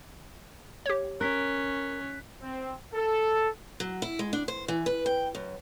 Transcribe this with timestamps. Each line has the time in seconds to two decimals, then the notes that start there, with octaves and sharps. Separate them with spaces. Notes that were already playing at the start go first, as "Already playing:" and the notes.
0.86 G4 C#5
1.21 C#4 A#4 F#6 B6
2.42 C4
2.94 A4
3.80 F#3
4.02 E4
4.19 G#3
4.33 D4
4.48 C5
4.68 E3
4.86 B4
5.06 G5
5.35 F#2